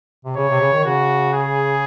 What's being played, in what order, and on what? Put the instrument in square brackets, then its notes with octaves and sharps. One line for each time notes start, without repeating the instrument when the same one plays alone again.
[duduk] C3
[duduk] C#3 [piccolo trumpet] C#5
[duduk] C3
C#3
D#3
[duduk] C#3 [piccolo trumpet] F#4
[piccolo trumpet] G#4